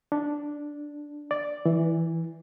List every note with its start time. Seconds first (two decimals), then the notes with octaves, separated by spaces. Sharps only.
0.12 D4
1.31 D5
1.66 E3